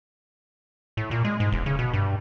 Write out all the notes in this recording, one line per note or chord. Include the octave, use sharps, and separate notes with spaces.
A2
A#2
G#3
G#2
E1
C#3
B2
G2